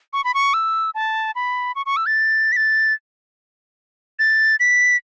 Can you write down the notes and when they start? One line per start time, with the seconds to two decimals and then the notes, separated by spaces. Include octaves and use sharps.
0.13 C#6
0.24 B5
0.34 C#6
0.54 E6
0.95 A5
1.35 B5
1.76 C#6
1.86 C#6
1.97 E6
2.06 A6
2.52 B6
2.57 A6
4.19 A6
4.60 B6